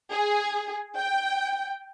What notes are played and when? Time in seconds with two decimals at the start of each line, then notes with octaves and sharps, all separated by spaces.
0.12 G#4
0.96 G5